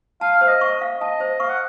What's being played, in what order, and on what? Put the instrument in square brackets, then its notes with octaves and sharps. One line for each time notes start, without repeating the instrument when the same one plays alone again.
[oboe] F5 [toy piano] A5
[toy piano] C5 [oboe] F5
[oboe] D#5
[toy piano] C#6
F5
[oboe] D#5 [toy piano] A5
[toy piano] C5
[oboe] F5 [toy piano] C#6
[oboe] F#5